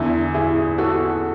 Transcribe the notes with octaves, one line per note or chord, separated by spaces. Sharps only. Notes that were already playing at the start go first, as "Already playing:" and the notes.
Already playing: E2 D3 E4
E4 G#4
F#4 A4